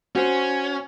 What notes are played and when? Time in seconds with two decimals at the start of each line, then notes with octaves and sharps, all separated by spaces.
0.15 C#4 F#4 C5